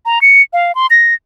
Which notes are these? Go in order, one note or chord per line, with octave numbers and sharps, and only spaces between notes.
A#5
C#7
F5
C6
A#6